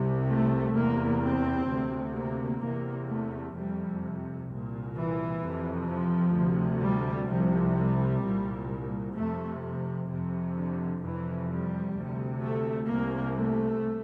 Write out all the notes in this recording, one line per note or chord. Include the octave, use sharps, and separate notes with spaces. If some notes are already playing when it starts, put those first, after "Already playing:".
Already playing: C2 C3
A3
E2 C3 A#3
C4
D2 C3
A#3
E2 C3 A#3
A3
F2 C3 G3
C2 A#2
E3
F2 C3
F3
D2 C3
G3
C2 C3 F3
G3
C2 A#2
F2 C3 A3
F2 C3
D3
F2 C3 E3
G3
D2 C3
A3
C2 C3 A#3
A3